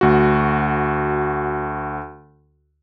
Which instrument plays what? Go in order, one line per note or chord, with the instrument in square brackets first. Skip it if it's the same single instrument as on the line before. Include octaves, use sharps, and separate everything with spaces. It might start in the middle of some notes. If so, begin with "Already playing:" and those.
[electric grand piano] D2 F#4